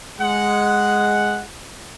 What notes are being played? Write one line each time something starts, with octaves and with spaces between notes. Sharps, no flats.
G#3 F#5